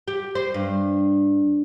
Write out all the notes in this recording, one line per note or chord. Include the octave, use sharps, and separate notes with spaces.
G4
C5
G2